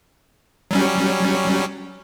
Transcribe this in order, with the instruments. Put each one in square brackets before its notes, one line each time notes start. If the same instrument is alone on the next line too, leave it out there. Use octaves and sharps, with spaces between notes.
[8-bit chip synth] F#3 G3 C#4